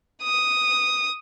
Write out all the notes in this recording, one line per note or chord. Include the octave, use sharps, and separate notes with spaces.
D#6